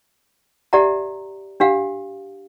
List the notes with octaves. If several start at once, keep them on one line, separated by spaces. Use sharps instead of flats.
G4 D5 E5 F#5 A#5
D4 G4 F5 F#5